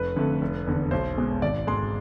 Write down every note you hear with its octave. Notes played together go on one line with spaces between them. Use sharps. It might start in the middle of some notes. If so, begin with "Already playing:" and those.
Already playing: F1 B4
F2 D3 A3
F1
E2 D3
B1 C5
B2 G#3
G#1 D5
G#2 G#3 C6